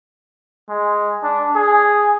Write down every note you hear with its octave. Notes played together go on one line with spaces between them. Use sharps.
G#3
D4
G#4